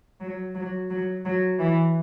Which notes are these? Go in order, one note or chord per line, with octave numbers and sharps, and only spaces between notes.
F#3
F#3
F#3
F#3
E3